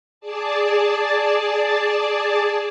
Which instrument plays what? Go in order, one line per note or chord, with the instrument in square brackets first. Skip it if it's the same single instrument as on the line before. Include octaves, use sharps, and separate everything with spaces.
[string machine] G#4 D5 A5